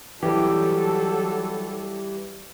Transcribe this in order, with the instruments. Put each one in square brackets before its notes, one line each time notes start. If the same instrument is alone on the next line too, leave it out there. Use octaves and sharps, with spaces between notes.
[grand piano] E3 [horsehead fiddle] F#3 A4 [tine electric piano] G3 G4